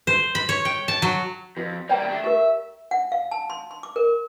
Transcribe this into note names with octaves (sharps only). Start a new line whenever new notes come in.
C5
B5
C#5
G5
A5
F#3
F2 F#4
G3 A#3 D5 G5 A#5
A3 D4
G4 A#4 E5
F#5
F5
A5
C6
C6
D6
A#4